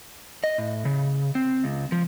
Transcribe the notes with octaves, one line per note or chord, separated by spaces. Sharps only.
D#5
A2
C#3
C4
C#2
F3